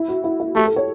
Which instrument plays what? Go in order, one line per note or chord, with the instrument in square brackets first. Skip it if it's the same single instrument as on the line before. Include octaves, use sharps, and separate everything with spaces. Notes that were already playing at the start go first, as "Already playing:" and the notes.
Already playing: [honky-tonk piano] E4
F#4
E4
E4
[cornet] A3 [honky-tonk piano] G4
[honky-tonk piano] A4
C#5